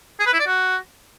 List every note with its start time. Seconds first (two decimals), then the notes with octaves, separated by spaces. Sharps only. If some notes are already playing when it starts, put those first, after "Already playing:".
0.19 G#4
0.26 B4
0.33 E4
0.40 D5
0.46 F#4